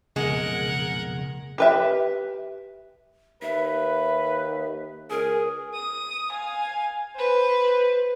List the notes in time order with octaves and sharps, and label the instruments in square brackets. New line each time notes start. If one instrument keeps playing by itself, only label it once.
[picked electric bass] B1 F2 A#2 [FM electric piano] C#3 [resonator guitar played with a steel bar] G#3 [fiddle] A#4 F#5
[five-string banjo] G4 B4 E5
[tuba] D#2 [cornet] B4 [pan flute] E5
[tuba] C#2 [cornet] G#4 [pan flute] A#4
[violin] D#6
F5 G#5
B4 C5